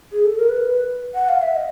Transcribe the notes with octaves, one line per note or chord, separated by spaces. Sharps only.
G#4
A4
A#4
B4
F#5
F5
E5
D#5